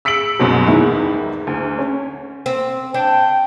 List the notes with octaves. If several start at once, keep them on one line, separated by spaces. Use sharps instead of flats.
E6 B6 C#7 D7 F#7
C2 F#2 B2 F#3
E2 G#2 D#3 E4
D2
C#4
C4
D4 G5